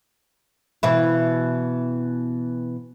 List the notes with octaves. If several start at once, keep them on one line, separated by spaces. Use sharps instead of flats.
B2 E3 E4